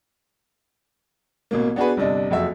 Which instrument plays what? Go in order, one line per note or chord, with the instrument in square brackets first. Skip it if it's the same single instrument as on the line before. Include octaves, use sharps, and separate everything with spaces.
[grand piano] A1 B2 A#3
B3 D4 F#4 G#4 B4
G1 C3 D4 D#5
F#1 F2 F#4 E5